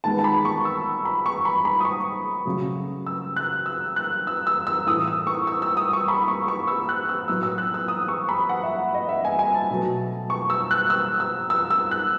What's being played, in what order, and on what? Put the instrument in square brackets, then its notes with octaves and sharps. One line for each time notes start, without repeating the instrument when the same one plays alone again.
[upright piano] D#3 G#3 B3 A5
A5
B5
C#6
E6
B5
C#6
B5
B5
D#6
C#6
C#3 F#3 A3
E6
F#6
E6
F#6
E6
E6
E6
A2 E3 A3 D#6
E6
C#6
E6
E6
D#6
C#6
B5
C#6
C#6
E6
F#6
E6
A2 F#3 B3 E6
E6
F#6
E6
D#6
C#6
B5
F#5
E5
D#5
E5
G#5
G#5
A5
B2 F#3 A3
C#6
E6
F#6
E6
E6
E6
E6
F#6